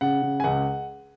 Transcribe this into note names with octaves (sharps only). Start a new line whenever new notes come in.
C#3 F#5
C#3
G#5
C#2 F#5